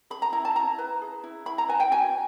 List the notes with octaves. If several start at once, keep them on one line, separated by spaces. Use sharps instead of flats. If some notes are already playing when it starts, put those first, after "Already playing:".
G#4 B5
A#5
E4 A#5
A5
E4 A#5
B4
G#4
E4
E4 B5
A#5
B4 G#5
G5
F#4 G#5